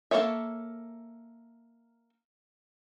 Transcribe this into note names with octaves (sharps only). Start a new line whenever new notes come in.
A#3 F#4 A4 C#5 E5